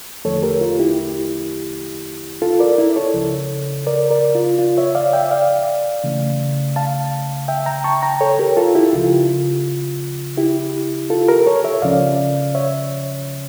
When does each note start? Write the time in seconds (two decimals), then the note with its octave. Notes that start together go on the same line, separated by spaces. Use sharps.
0.25 E2 D3 F3 A3 A4 C#5
0.43 G4 A#4
0.61 F4
0.79 E4 G4
2.42 F4 A4
2.59 A#4 D5
2.78 E4
2.96 A4 C#5
3.14 C#2 C#3 F3
3.87 A#4 D5
4.11 A#4 D5
4.35 F4
4.59 F4
4.77 C#5 E5
4.95 D5 F5
5.13 E5 G5
5.31 D5 F5
6.04 C#3 E3 A3
6.76 F5 A5
7.48 E5 G5
7.66 G5 A#5
7.84 A5 C#6
8.03 G5 A#5
8.21 A4 C#5
8.39 G4 A#4
8.57 F4 A4
8.75 E4 G4
8.93 C#2 C#3 F3 F4
10.38 E4 G4
11.10 F4 A4
11.28 G4 A#4
11.46 A4 C#5
11.64 C#5 E5
11.82 C#2 C#3 F3 C#4 D5 F5
12.55 C#5 E5